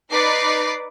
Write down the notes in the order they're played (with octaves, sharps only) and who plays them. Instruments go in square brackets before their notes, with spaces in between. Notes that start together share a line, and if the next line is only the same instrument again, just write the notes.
[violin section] D#4 B4 D5 D6 A6 C7